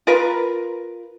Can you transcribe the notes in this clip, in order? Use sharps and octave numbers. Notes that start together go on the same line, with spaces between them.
F4 A#4 B4